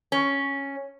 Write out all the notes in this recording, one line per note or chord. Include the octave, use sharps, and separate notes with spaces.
C#4